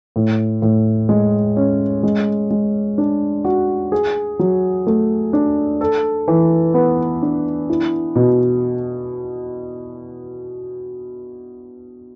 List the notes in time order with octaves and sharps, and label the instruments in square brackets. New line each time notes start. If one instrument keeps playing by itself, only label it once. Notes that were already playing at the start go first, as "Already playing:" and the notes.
[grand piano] A2
A2
G#3
C#4
G#3
G#3
D4
F#4
G#4
F#3
A3
D4
A4
E3
B3
D4
E4
B2